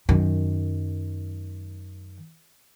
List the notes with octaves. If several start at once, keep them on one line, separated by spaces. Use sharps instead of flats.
F#2 D#3